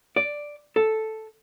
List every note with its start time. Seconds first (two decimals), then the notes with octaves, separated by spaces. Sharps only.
0.16 D5
0.76 A4